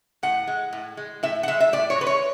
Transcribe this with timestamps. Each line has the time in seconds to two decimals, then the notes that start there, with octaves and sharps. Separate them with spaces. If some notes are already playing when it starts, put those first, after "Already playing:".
0.23 A2 F#5
0.47 G#3
0.73 A2
0.97 G#3
1.23 A2 E5
1.43 F#5
1.48 G#3 E5
1.60 E5
1.73 A2 D5
1.90 C#5
1.98 G#3 B4
2.07 C#5